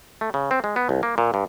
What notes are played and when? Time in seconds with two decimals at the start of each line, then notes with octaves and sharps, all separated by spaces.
0.21 A3
0.34 C#3
0.51 C4
0.64 G#3
0.76 B3
0.89 C2
1.03 A#3
1.18 A#2
1.34 G2